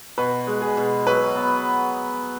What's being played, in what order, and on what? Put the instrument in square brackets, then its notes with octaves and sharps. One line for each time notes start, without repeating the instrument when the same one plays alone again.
[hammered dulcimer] B2 [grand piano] B4
[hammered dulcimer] G#3
[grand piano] G#4
[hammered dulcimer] B2
[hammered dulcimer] F#3 [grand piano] B4
[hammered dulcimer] B3